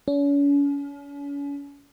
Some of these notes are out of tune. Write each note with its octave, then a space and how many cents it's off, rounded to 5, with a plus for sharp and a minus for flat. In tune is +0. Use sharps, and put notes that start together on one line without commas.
C#4 +40